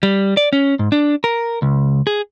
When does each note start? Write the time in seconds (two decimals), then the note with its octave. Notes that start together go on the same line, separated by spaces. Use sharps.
0.03 G3
0.37 D5
0.53 C#4
0.79 G#2
0.92 D4
1.24 A#4
1.62 C#2
2.07 G#4